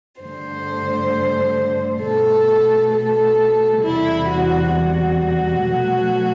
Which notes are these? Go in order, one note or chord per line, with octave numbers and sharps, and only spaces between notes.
G2 D3 A3 C5
B2 A3 A4
A4
E2 C3 G3 E4
F#4
F#4
B2 F#3 A3